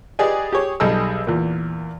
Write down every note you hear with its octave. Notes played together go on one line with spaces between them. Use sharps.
G4 G#4 B4 D5 D#5 G#5
G4 G#4 C#5
B1 G3 G#4 A4 D#5 E6
E2 A#2